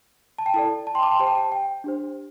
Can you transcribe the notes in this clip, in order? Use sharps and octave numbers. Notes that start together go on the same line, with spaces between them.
A5
G5
E4 A4 D5 A5
A5
G5 C6
A5 D6
G5 C6
G4 C5 A5
G5
A5
G5
D4 G4 C5